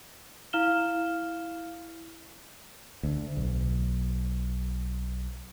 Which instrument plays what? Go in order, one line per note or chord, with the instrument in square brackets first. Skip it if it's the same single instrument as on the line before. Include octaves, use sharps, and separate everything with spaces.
[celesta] E4 F5 F6 E7 G7
[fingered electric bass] D2
B1